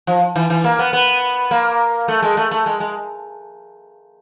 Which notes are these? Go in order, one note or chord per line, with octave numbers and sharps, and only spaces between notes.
F3
E3
E3
A#3
B3
B3
A#3
A3
G#3
A3
A3
G#3
G#3